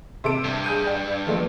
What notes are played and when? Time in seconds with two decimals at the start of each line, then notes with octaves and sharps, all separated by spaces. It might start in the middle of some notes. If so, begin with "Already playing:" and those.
0.24 C3 A4 D7
0.44 G2
0.64 G#4 G6 D#7
0.87 G5
1.27 F3 A3 B3